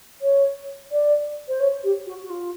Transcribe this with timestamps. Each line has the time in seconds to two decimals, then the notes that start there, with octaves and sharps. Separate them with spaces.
0.21 C#5
0.91 D5
1.48 C5
1.60 C#5
1.83 G4
2.06 F#4
2.22 F#4
2.29 F4